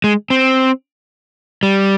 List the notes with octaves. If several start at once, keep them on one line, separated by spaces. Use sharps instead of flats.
G#3
C4
G3